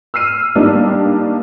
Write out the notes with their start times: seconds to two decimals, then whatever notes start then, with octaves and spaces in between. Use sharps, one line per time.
0.14 E6 F6 C7 D#7
0.55 D#3 G3 A#3 D4